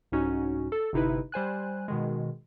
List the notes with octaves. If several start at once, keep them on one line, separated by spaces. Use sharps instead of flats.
C2 G#2 C#4 D#4 F#4
A4
G1 C3 D#4 E4 B4
G3 C5 G#5 F#6
B2 D#3 G#3